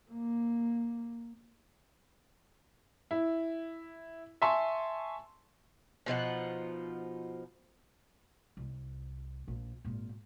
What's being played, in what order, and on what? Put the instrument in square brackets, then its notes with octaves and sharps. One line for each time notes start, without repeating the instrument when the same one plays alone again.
[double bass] A#3
[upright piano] E4
E5 G#5 A5 C6 C#6
[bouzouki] B2 F3 D#4 F#5
[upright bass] C2
A#1
G#1 A#2